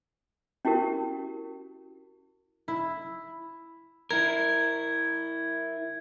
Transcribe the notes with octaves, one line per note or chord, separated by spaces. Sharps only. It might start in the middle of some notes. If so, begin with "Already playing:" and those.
C#4 E4 F#4 G4 A#4
E4
E4 A#4 G#6